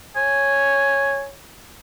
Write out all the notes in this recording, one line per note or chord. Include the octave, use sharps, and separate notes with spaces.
C#5 G#5